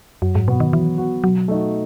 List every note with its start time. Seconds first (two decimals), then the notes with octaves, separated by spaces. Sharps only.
0.22 F#2 F#3
0.35 G#2
0.48 B2 B3 F#4
0.60 D#3
0.72 E3 F#3
0.98 B3 F#4
1.24 B2 F#3
1.48 A3 D#4 F#4